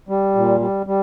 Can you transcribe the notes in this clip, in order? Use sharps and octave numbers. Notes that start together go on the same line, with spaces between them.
G3
A#2
G3
G3